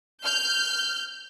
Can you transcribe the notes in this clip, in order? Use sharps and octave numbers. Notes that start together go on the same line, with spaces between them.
F6 G6